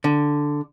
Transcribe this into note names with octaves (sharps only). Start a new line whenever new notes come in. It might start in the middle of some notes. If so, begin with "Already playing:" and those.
D3